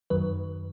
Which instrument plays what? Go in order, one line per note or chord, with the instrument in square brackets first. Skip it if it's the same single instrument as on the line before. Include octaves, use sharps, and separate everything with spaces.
[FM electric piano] F#2 D#3 F#3 B4